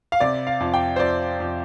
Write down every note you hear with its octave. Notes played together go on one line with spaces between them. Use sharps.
F5
C3 D5
F5
F2
G5
C5
F2 D5
F2